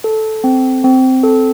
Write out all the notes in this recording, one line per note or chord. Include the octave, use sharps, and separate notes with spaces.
A4
C4
C4
A4